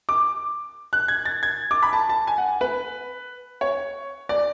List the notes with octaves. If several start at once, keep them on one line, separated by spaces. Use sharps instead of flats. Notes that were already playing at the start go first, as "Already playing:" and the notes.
D6
F#6
G#6
A6
G#6
D6
B5
A5
A5
G#5
F#5
B4
C#5
D5